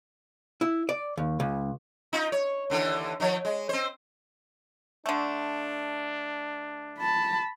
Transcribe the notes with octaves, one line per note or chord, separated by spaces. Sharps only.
E4
D5
D#2
C#2
D#4 F4
C#5
D#2 D3 E3
D#3 F3 C#5
G#3
C4 C5
D3 A3 D4
A5 B5